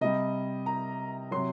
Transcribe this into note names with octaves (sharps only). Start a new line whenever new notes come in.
C3 G3 D#5
A#5
C3 F#3 C6